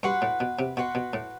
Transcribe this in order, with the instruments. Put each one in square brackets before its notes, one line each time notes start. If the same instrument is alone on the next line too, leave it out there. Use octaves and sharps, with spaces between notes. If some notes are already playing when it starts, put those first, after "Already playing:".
[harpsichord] G2 [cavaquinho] F#4 B4 F#5 C6
[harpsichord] A2
B2
C3
[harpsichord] B2 [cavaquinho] F#4 B4 F#5 C6
[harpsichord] B2
A2